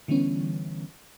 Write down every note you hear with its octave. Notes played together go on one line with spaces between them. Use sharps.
D3 E3 G3 B3 C#4